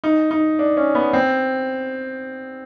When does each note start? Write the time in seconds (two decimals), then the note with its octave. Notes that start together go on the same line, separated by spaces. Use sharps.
0.04 D#4
0.31 D#4
0.59 D4
0.77 C#4
0.95 B3
1.13 C4